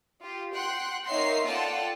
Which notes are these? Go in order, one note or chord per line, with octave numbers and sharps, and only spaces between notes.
F4 G4
F#5 G5 C6 F#6
A#3 D#4 C#5 E5 C6 C7
F4 A4 D5 F#5 G5 A5